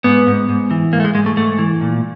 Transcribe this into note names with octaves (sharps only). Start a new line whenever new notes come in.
G#2 B3
G#2
G#2
E3
G#2 A#3
A3
G#3
G#2 G#3
A3
G#2 A3
E3
A#2